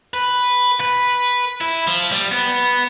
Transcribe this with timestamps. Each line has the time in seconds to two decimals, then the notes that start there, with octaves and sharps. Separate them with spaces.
0.14 B4
0.80 B4
1.61 E4
1.87 F3
2.12 G3
2.31 B3